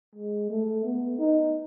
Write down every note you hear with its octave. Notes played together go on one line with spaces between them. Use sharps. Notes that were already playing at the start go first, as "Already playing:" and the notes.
G#3
A3
B3
D#4